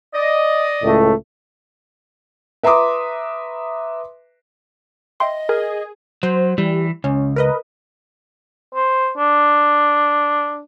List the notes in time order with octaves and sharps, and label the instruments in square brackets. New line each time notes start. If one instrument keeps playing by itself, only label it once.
[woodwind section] D5 D#5
[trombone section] C#2 A2 A3
[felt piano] B4 E5 A#5 C6 D6 D#6
[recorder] D#5 [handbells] E5 G5 C6
[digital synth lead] G#4 [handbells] A#4
[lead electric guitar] F#3 [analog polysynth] C5
[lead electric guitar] E3 [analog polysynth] G3
[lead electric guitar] C#2 [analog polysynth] C#4
[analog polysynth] A#4 B4 D#5
[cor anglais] C5
D4